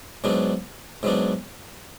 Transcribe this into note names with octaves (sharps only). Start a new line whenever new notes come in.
G#2 F#3 B3 D4
G#2 F#3 B3 D4